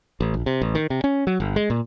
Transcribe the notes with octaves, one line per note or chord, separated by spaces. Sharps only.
A1
A#1
C3
A1
D#3
C3
C#4
F#3
G1
G#3
A#2